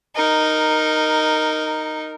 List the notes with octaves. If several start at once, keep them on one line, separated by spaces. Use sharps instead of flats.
D#4 A#4